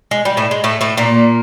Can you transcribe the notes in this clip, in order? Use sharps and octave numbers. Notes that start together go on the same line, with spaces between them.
G#3
G3
A2 A3
G#3
A2 A3
A2 A3
A#2 A#3